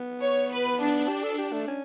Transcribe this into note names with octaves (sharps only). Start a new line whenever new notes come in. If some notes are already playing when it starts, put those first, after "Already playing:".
Already playing: B3
C#5
B4
D4
G4
A4
G4
A3
C#4